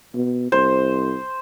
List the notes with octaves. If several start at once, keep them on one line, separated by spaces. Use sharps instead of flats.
B2
C2 C5